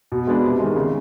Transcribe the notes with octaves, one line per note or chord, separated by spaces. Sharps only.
B2
G#3 B3 D4
C3
D#3 G#3
C#3